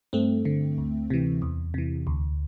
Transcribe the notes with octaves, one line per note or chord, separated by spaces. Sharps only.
G2 A3 C4
D3
D2
C3 E3
E2
C3 E3
D2